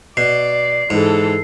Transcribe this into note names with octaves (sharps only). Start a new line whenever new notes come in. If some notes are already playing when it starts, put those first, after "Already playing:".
B2 D5 C7
G#2 E3 A4